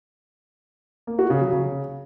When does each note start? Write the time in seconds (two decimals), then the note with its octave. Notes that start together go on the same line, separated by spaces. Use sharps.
1.07 A#3
1.19 F#4
1.30 C#3
1.41 F#3
1.53 C#3